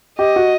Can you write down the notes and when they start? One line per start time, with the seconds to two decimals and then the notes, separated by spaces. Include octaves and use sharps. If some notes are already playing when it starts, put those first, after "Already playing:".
0.18 G4 D#5
0.36 F#4